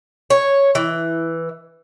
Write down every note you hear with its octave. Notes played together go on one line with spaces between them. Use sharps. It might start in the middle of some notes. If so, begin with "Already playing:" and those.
C#5
E3